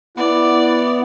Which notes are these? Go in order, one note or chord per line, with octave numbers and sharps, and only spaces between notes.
B3 E4 D5